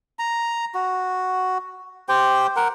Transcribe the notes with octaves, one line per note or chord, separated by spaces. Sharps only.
A#5
F#4
G4 C5 G5
A#4 F#5